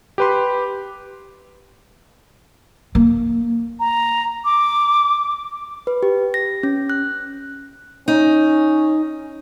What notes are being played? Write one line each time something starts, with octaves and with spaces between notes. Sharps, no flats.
G4 B4 C6
A#3
A#5
D6
B4
G4
A#6
C#4
F#6
C#4 D#4